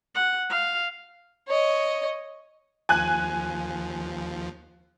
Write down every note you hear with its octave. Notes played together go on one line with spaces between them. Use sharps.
F#5
F5
C#5 D#5
D#2 F3 G#5 F#6